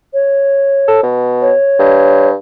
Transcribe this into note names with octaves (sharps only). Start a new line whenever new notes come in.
C#5
A4
B2
C#5
G2